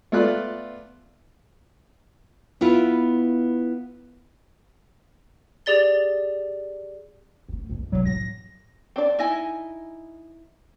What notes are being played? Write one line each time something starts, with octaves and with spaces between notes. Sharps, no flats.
A3 B3 F4 D5 F#6
B3 E4 F4 B4
G4 G#4 D5 A6 G7
A3 B3
A#1 F2
C3 E3 F#3
A2 F#3 A#6
C4 D4 D5
D#4 E4 D#5 G#5